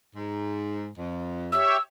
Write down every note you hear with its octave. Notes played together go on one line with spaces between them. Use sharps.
G#2
F2
G4 C#5 E5 E6